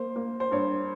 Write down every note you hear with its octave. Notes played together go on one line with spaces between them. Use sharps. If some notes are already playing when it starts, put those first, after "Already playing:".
Already playing: A#3 C5
A#3
C5
G2 C#5